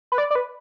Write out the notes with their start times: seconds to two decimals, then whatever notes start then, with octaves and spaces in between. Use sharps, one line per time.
0.12 B4
0.18 D5
0.31 D5
0.35 B4